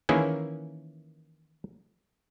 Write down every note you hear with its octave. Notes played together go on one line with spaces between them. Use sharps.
D#3 E3 A#3 C#4 E4 G#4